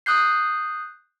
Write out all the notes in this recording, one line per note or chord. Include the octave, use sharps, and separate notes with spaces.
D#6 F#6 G6 C7